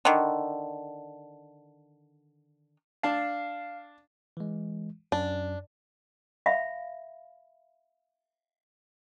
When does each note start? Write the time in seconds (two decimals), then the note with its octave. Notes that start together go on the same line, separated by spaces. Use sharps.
0.05 D3 D#3
3.03 D4 F5 A5
4.37 E3 G#3
5.12 F#2 D4
6.46 E5 F5 B5